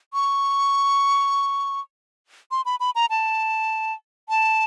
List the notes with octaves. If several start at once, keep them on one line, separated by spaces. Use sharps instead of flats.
C#6
C6
B5
B5
A#5
A5
A5